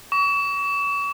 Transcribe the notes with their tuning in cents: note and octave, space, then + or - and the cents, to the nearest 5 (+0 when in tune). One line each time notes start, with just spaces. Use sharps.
C#6 +40